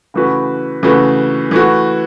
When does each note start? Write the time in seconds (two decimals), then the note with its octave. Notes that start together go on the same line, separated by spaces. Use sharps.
0.14 C#3 E3 A3 F#4 B4
0.83 C#3 E3 A3 F#4 B4
1.51 E3 A3 F#4